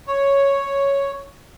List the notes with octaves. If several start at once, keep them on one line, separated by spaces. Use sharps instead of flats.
C#5